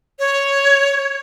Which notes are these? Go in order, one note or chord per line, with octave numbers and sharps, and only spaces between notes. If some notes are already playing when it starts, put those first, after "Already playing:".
C#5